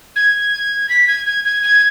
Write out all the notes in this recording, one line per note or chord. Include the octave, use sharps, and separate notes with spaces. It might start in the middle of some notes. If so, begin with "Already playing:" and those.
G#6
B6
G#6
G#6
G#6
G#6